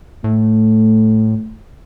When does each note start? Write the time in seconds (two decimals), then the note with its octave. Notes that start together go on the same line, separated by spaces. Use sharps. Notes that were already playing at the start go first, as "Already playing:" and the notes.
0.24 A2 A3